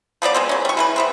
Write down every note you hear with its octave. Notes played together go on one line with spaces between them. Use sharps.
F3 B3 G4 D5
G#3 B3 C4
F#3 C#4
G3 C#6
E3 G#3 B4
C3 B3 C4